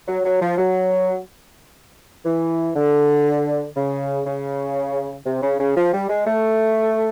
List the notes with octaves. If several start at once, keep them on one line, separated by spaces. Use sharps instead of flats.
F#3
F#3
F3
F#3
E3
D3
C#3
C#3
C3
C#3
C#3
F3
G3
G#3
A3